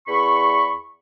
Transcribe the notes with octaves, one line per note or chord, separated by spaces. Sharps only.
E2 B5 C#6